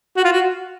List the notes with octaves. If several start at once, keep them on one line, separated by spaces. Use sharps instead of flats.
F#4
F4
F#4